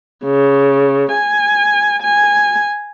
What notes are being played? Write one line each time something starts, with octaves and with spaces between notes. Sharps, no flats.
C#3
G#5
G#5